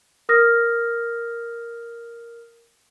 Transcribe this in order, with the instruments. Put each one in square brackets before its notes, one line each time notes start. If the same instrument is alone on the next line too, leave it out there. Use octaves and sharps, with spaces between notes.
[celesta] A#4 D#6 F6 A#6